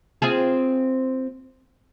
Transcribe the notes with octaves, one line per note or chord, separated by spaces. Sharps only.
C4 F4 G#4